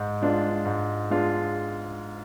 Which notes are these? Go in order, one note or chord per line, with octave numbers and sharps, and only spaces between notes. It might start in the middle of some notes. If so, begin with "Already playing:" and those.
Already playing: G#2
G#3 D4 F4
G#2
G#3 D4 F4